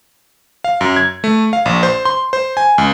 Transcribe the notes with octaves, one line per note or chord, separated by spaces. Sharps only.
F5
F#2
G#6
A3
F5
A#1
C5
C6
C5
G#5
C#2